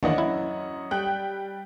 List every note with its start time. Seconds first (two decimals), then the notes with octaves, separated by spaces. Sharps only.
0.03 D#2 E3 A#3 D4 C#5 D#5 F#5
0.18 F#2 E4
0.91 G3 G5 F#6